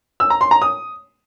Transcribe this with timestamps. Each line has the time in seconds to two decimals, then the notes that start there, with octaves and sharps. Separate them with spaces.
0.20 E6
0.30 A#5
0.41 C6
0.51 A#5
0.62 D#6